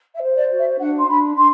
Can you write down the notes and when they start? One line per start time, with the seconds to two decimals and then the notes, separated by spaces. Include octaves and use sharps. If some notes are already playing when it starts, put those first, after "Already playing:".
0.15 E5
0.21 C5
0.36 D5
0.51 F#4
0.58 E5
0.78 D4 F#5
0.98 C6
1.07 D4 B5
1.36 D4 C6